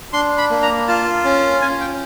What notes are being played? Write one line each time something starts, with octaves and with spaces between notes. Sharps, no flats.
D4 C6
B5
A#3
A#5
F4 A5
C#4
C#4 G#5
G5